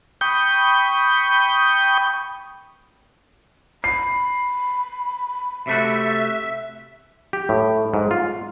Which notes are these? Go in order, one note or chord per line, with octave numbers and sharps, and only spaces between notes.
G5 B5 C#6 D#6 G6
B5 C7
C3 A3 F#4 E5
G4
A2
G#2
F4